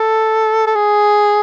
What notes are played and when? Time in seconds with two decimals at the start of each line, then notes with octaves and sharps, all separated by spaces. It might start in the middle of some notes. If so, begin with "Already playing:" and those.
Already playing: A4
0.67 A4
0.75 G#4